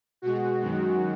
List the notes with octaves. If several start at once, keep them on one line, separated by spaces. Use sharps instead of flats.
B2 G#3 F#4
F#2 D#3 G#3